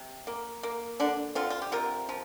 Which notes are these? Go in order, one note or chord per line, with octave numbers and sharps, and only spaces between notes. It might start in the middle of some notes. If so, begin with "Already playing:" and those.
Already playing: C3
A#3
A#3
D3 D4
D3 C4 F4
F4
G4
C3 F4 A#4
F3